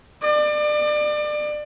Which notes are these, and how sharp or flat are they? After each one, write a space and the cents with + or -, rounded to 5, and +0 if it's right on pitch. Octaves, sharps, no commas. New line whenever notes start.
D5 +30